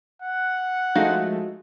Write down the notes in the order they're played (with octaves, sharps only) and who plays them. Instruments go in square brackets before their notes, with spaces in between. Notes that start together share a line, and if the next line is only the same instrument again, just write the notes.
[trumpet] F#5
[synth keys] F3 G#3 A3 [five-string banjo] D#4 F#4 F5